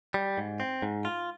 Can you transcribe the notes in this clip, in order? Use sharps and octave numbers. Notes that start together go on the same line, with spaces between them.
G3
G#2
C4
G#2
F4